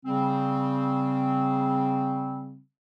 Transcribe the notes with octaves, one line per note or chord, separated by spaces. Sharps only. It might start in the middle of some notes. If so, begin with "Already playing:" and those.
C#3 G3 C4